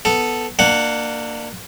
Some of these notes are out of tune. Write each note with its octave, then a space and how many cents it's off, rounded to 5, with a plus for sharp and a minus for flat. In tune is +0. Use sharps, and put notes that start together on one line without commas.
B3 +0 A4 +0
A#3 -10 D4 +30 F#5 +0